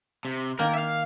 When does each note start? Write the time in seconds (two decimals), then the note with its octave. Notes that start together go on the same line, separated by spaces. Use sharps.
0.25 C3
0.59 D#3 A#3 A#4
0.74 E5 F5